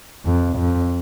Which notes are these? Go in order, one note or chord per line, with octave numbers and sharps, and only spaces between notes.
F2
F2